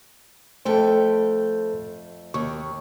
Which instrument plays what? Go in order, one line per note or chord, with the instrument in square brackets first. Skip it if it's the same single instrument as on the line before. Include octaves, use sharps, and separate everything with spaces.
[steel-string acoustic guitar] F2 A3 G5 [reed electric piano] A4 C5
[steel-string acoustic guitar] D#2 [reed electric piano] C#6